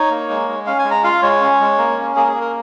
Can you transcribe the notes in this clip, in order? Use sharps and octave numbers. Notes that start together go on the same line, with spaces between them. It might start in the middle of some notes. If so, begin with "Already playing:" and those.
Already playing: D#4 C#5
A#3
G#3
G#3
C#4 F5
G#5
G#3
A#5
F4 F5
G#3 C#5
C#4
G#3
A#3
C#4
A#3 G#4
A#4
G#4
A#3
A#4